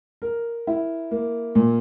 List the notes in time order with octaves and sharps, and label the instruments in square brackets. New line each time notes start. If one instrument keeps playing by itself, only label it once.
[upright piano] A#4
E4
A#3
A#2